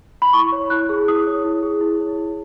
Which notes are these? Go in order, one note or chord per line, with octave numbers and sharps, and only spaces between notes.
B5
E4 C#6
C#5
E4 F#6
G#4
E4 D#6
C#5
E4
G#4
E4
C#5
E4